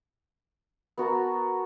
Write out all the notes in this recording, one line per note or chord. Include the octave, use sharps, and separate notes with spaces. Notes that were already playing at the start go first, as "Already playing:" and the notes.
B3 F#4 A#4 A5